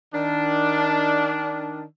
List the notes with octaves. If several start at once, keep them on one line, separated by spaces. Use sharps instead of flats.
D#3 D4